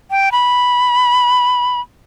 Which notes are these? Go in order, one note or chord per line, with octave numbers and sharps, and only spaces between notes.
G5
B5